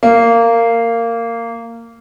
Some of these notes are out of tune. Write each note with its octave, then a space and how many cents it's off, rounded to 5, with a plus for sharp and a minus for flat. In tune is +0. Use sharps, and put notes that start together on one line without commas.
A#3 -15